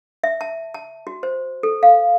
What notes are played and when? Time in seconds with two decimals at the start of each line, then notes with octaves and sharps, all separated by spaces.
0.24 E5
0.41 A5
0.74 A5
1.07 F#4
1.23 C5
1.63 A4
1.83 F5